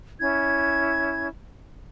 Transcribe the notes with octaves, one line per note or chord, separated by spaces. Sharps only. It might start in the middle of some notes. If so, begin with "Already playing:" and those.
C#4 E4 G#6